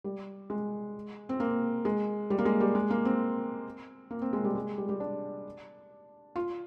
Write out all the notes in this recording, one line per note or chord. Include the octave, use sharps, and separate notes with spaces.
G3
G#3
C4
A#3
G#3
G3
A#3
G#3
G3
G#3
A#3
C4
A#3
C4
G#3
G3
G#3
G3
G3
D4
F4